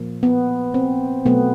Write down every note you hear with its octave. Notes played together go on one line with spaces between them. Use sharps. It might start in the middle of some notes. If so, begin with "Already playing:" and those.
Already playing: A#2 F3 A#3
B3
C4
B2 F#3 A3 B3